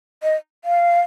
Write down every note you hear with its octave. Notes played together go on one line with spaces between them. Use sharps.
D#5
F5